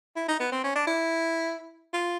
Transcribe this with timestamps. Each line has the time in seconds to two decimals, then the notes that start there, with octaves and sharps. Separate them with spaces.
0.16 E4
0.28 D#4
0.40 B3
0.52 C4
0.64 C#4
0.75 D4
0.87 E4
1.93 F4